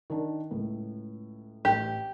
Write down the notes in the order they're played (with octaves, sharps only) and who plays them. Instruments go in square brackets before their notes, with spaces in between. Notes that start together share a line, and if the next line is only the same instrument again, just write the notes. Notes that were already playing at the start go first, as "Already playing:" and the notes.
[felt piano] D#3 D4
C#2 A2
[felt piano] A1 [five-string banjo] G4